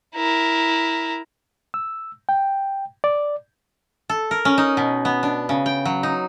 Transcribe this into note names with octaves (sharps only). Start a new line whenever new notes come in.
E4 A#4
E6
G5
D5
A4
A#4
C#4
D#4
B2
B3
D4
C#3
G5
F#3
D#4